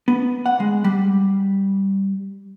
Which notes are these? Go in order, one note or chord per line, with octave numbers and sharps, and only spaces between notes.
B3
F#5
G#3
G3